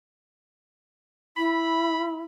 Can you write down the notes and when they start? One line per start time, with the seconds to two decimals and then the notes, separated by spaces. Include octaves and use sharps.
1.37 E4 B5